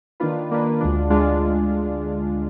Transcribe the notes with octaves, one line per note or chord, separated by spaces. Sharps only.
D#3 A#3 D4 F4 B4
D#3 A#3 D4 F4 B4
D2 D3 G#3 D4 F4
D2 D3 G#3 D4 F4